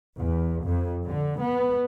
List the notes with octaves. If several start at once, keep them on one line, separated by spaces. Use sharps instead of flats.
E2
F2
D3
B3